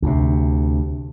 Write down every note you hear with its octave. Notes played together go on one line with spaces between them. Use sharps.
D2 C3